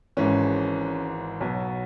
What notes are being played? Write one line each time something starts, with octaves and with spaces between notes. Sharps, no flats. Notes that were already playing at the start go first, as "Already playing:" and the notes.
G#1 G#2 E3 C#4
B1 B2 F#3